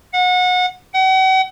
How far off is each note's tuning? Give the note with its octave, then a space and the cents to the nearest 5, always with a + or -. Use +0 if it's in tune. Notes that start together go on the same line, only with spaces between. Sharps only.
F#5 -30
F#5 +40